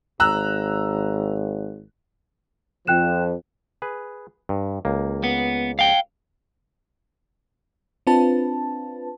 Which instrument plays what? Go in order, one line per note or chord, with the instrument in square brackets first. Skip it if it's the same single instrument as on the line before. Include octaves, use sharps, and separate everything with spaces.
[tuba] G#1 [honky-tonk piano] A#5 E6 F#6
[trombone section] F2 F3 [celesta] G5 F#6 E7
[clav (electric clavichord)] G#4 B4
G2
C#2 A#3
[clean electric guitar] B3
F5 G5
[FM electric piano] C4 D4 F4 B4 A5